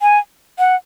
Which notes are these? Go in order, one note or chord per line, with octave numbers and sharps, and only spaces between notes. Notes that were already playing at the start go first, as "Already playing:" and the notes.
G#5
F#5